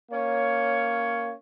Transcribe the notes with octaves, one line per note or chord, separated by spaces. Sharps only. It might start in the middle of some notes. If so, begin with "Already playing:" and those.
A#3 C#4 C#5